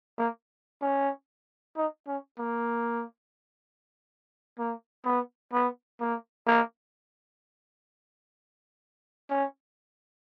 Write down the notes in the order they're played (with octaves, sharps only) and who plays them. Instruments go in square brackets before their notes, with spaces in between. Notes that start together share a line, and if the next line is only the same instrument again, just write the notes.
[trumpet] A#3
C#4
D#4
C#4
A#3
A#3
B3
B3
A#3
A#3
C#4